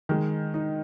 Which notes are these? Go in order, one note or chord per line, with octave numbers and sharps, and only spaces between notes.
D#3 G#3
D#4